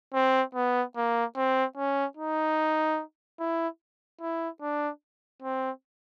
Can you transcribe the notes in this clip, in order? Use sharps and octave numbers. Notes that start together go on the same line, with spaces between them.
C4
B3
A#3
C4
C#4
D#4
E4
E4
D4
C4